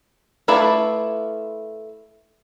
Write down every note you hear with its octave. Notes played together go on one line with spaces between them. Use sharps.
A3 E4 F4 B4 D5